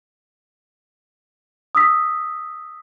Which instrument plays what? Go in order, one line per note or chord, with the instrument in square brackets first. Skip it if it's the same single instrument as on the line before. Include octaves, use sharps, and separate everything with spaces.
[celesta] D#6 E6 B6